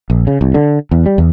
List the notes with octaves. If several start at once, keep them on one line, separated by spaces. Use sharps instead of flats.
A#1
C#3
C2
D3
E2
G3
E2